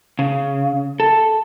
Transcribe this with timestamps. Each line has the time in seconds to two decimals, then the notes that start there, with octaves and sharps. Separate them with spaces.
0.19 C#3
1.00 A4